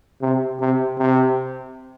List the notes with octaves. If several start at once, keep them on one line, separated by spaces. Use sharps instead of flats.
C3
C3
C3